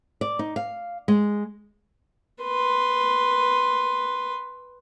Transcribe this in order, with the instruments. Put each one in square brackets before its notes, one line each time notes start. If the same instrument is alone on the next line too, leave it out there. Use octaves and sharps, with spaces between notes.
[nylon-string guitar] D5
D#4
F5
G#3
[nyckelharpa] B4 C6